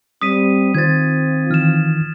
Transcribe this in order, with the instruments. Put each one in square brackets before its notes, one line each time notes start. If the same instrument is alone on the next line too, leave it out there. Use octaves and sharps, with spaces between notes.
[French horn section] G3 C4 [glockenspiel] D#6 B6 D#7
[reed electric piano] D#3 C5 [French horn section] C4 F4 [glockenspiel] G#6 A6
[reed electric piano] D#3 E3 [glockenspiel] F6 E7